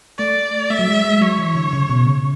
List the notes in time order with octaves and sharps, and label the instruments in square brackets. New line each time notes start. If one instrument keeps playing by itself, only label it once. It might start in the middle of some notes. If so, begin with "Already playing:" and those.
[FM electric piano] A3 [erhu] D5
[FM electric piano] A3 [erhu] E5
[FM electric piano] F#3
G#3
G#3
[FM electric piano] F#3 [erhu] C#5
[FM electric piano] E3
D3
C#3
B2
C#3